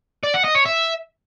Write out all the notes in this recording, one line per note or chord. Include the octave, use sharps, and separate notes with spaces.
D5
F#5
D#5
C#5
E5